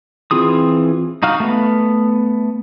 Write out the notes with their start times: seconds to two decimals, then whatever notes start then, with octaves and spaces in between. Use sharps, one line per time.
0.31 E3 C4 F4 G#4 D#6
1.23 D#4 F#4 F5 F6
1.40 A3 B3